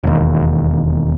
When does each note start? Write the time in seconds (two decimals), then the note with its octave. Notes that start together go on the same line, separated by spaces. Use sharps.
0.03 E1 D#2